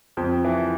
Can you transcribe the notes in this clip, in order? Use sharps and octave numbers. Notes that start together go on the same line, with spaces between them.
F2
E3